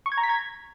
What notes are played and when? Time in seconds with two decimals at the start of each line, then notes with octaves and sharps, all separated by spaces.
0.06 C#6
0.12 G#6
0.18 A#5
0.23 B6
0.29 G#6